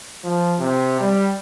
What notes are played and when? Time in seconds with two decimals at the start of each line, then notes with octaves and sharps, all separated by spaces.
0.24 F3
0.60 C3
1.01 G3